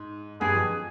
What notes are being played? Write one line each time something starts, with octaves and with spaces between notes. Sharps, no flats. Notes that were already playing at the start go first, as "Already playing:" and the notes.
Already playing: G#2
G2 G#4
F2